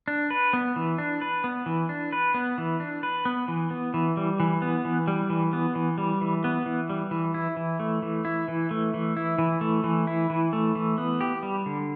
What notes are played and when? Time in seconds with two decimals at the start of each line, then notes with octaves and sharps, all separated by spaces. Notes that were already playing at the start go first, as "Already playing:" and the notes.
0.08 D4
0.30 B4
0.53 B3
0.76 E3
0.98 D4
1.21 B4
1.44 B3
1.66 E3
1.89 D4
2.12 B4
2.34 B3
2.58 E3
2.80 D4
3.03 B4
3.25 B3
3.48 E3
3.70 B3
3.94 E3
4.17 G3
4.40 E3
4.62 B3
4.85 E3
5.08 G3
5.30 E3
5.53 B3
5.75 E3
5.98 G3
6.21 E3
6.44 B3
6.66 E3
6.90 G3
7.11 E3
7.34 E4
7.57 E3
7.80 A3
8.02 E3
8.25 E4
8.48 E3
8.71 A3
8.94 E3
9.17 E4
9.38 E3
9.61 A3
9.84 E3
10.07 E4
10.30 E3
10.53 A3
10.75 E3
10.98 B3
11.21 G4
11.43 G3
11.66 D3